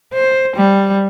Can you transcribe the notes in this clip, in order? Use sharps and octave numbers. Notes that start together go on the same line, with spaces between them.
C5
G3